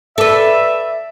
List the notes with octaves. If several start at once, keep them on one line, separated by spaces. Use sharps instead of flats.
A4 B4 D5 E5